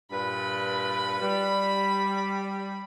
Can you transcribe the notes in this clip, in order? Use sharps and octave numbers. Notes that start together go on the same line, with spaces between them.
G2 A#2 B4 B5
G3